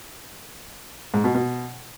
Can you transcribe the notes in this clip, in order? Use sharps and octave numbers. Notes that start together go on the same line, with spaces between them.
G#2
B2
B2